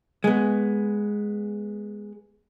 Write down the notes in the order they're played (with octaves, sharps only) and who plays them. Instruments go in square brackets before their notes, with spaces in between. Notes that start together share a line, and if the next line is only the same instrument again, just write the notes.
[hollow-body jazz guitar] G#3 B3